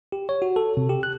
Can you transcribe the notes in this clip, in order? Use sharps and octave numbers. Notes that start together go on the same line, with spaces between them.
G4
C#5
F#4
A4
C3
G4
F#6